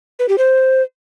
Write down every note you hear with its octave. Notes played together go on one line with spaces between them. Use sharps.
B4
G4
C5